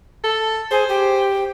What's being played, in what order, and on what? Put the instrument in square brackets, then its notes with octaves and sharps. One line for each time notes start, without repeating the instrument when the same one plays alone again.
[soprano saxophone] A4
[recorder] G#4 [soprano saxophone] C5
[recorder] G4